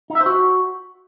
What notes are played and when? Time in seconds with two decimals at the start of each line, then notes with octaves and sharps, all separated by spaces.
0.10 D#4
0.15 E5
0.21 C5
0.26 F#4